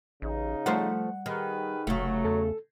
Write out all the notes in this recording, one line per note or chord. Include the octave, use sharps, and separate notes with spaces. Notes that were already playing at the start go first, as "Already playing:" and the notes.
A1 C#3 D#4
F3 G3 A3 C5 F#5
D#3 G4 G#4 B4
F1 C#3 F#3 A3
E2 A4